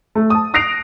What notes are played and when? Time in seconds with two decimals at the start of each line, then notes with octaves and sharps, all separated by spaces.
0.15 A3
0.30 A5 D#6
0.54 D#6 F#6 A#6 C7 D7 F7